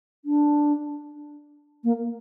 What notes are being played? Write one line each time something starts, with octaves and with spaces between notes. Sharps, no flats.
D4
A#3